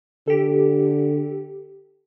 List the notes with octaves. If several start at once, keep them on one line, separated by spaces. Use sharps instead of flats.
D3 G4 A4